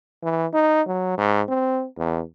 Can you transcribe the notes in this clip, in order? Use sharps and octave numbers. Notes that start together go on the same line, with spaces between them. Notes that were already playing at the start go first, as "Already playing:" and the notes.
E3
D#4
F#3
G#2
C4
E2